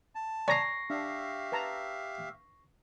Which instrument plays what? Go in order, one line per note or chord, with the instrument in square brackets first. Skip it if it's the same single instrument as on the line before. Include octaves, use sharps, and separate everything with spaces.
[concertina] A5
[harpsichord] D5 D6 [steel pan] G#5 A#5 [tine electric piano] C#6 A#6 C7
[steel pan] D4 [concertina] G4 E5 F5
[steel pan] B4 A5 A#5